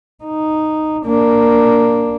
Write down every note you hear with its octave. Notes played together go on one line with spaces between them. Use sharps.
D#4
A#3 D4